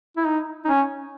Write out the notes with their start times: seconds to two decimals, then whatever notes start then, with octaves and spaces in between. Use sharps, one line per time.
0.17 E4
0.26 D#4
0.65 D#4
0.68 C#4